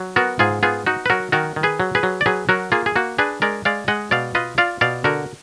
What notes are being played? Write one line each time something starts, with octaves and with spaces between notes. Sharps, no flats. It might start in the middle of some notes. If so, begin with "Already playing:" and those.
Already playing: F#3
B3 F#4 A#4
G#2 F4 G#4
B3 F4 G#4
D#4 F#4
B4
F#3 F#4 A#4
D#3 F#4 A#4
D#3
G#4 B4
F#3
G#4 B4
F#3
D5
F#3 G#4 B4
F#3 F#4 A#4
A#3 F4 G#4
G#4
A#3 F#4
D4 G#4 B4
G#3 A#4 D5
G#3 D5 F5
G#3 D#5 F#5
B2 D5 F5
F4 B4 D#5
F4 D5 F5
B2 D5 F5
D3 F#4 A#4